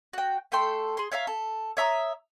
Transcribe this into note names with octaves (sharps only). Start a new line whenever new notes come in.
F#4 G5
A3 A4 G5 C6
G#4 C6
C#5 E5 F5 A#5
A4
C#5 E5 A#5 D#6